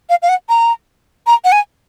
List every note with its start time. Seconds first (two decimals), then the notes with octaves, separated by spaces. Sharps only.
0.10 F5
0.22 F5
0.29 F#5
0.49 A#5
1.27 A#5
1.45 F#5
1.52 G#5